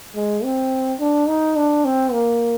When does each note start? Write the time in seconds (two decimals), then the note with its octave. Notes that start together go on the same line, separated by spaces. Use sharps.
0.15 G#3
0.44 C4
1.00 D4
1.28 D#4
1.56 D4
1.85 C4
2.12 A#3